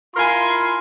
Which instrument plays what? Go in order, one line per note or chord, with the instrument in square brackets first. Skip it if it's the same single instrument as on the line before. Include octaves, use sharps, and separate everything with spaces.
[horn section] E4 F4 A#4 G#5 C6